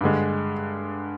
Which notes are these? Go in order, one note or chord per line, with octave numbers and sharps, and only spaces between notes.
G2 D3 G#3